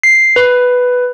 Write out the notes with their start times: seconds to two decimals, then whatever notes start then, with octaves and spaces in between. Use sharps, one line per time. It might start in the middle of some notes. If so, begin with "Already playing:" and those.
0.03 C7
0.36 B4